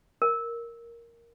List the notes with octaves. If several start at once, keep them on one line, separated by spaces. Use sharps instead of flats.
A#4